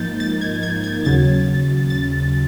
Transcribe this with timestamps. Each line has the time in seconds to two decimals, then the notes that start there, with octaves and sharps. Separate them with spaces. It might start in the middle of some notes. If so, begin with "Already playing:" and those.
Already playing: G#2 F3 A#3 D#4 G6 A6
0.20 A6
0.41 G#6
0.63 G#6
0.84 G#6
1.05 D#2 C#3 F#3 A6
1.90 A6